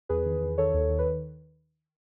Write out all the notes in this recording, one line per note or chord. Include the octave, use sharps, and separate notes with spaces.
E2 G#4 B4
D#3
E2
D#3 A4 C#5
D#2
D#3
B4